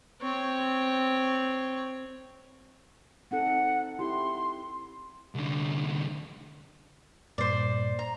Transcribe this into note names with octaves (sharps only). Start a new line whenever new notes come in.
C4 C#5
C4 D#4 A4 F#5
E4 G4 C6
C2 D3
G2 A#2 C5 D5
A#5